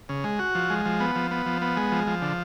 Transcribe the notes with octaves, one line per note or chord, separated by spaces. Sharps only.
C#3
G#3
F#4
F3
G#3
F3
B3
F3
B3
F3
B3
G#3
F3
F3
D3